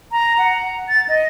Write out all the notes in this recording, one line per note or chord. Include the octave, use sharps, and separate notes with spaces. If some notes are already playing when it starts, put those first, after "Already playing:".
A#5
F#5
A6
D#5